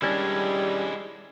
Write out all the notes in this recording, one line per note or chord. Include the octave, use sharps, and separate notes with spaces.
D#3 G3 G#3 C#4 D4 E4